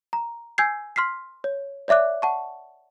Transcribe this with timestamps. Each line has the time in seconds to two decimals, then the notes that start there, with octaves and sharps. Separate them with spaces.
0.13 A#5
0.58 G#5 E6 G6 G#6 C7
0.96 C6 F6 B6 C7
1.44 C#5
1.88 C#5 D5 E5 D6 F#6
2.22 F#5 A5 C#6